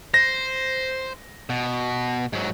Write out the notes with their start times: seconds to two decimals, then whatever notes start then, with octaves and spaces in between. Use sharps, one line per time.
0.14 C5 A#6
1.50 B2
2.33 G#2 F#3